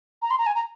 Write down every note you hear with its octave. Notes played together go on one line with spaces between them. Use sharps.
A#5
C6
A#5
G#5
A#5